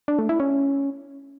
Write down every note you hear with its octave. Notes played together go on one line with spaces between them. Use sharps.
D4
A3
E4
C#4